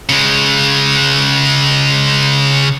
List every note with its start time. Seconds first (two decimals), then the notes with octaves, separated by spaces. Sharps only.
0.09 C#3 G#3